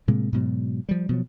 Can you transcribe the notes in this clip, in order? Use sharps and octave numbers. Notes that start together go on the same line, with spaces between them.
A2 C3 G#3 A#3
G#2 B2 F#3
F3 G3
B2 F3 F#3